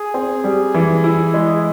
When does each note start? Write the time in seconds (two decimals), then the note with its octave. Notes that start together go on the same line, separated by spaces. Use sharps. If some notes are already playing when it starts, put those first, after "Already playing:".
Already playing: G#4
0.14 C4
0.44 G3
0.74 E3
1.04 E4
1.34 G#3